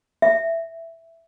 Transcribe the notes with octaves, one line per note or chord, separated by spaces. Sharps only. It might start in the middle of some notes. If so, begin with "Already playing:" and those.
E5